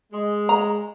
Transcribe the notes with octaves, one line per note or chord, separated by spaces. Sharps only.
G#3
A#5